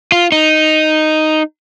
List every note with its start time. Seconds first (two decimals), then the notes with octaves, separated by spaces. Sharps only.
0.12 F4
0.32 D#4